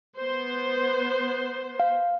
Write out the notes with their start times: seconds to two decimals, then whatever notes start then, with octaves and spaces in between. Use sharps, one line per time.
0.17 B3 C5
1.80 F5